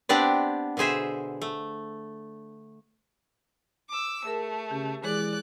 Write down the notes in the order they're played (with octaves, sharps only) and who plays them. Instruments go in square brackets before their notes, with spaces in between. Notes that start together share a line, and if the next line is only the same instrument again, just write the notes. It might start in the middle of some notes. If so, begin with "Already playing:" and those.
[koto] B3 C4 D4 G4 D5
B2 D3 G#4 C5 E5
A3
[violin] D6 E6
[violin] A3 [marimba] G#4 A#4
[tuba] C#3 [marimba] G4
[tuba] E3 [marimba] G#3 G#4 [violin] D5 F#6